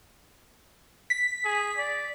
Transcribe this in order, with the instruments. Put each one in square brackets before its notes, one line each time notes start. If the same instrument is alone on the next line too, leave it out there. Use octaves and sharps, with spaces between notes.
[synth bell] B6
[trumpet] G#4
D5